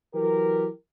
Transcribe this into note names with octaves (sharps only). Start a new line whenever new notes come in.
E3 F#3 G4 A#4